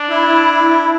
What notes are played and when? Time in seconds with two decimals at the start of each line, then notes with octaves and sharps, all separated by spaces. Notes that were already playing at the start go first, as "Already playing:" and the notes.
Already playing: D4
0.09 E4